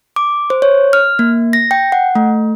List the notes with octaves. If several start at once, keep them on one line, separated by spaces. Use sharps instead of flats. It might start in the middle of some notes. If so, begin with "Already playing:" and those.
D6
C5
C#5
F6
A#3
A#6
G5
F#5
A3